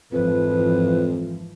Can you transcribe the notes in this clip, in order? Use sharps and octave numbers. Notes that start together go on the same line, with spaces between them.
G#1 F2 E3 F3 B4